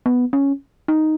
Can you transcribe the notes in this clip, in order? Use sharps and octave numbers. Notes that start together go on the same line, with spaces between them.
B3
C#4
D#4